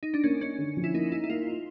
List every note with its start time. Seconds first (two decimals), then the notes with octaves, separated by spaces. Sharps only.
0.03 D#4
0.14 D4
0.24 A#3 C#4
0.41 C#4 D#4
0.58 D3
0.77 F3
0.84 E4
0.94 A#3 D#4
1.12 D#4 E4
1.24 E4
1.29 A#3 F4
1.47 D#4